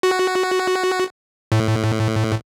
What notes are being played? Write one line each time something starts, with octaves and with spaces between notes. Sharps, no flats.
F#4
A2